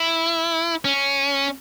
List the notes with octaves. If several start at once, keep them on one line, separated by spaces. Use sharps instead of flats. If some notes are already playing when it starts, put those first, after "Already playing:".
Already playing: E4
C#4